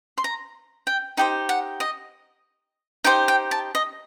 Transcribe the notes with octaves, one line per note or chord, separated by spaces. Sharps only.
C6
A#5
G5
D#4 G4 C5 G5
F#5
D#5
D#4 G4 C5 G5
G5
A5
D#5